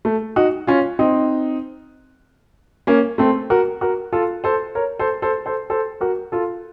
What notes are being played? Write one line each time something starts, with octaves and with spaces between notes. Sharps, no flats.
A3
D#4 F#4
C#4 F4
C4 D#4
A#3 C#4
A3 C4
F#4 A#4
F#4 A#4
F4 A4
A4 C5
A#4 C#5
A4 C5
A4 C5
A4 C5
A4 C5
F#4 A#4
F4 A4